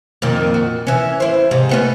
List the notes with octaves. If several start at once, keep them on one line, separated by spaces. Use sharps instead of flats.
F2 A#2 D#3
F#4
E3 C#4
E4 C5
G#2 C3
A3 B3 C#4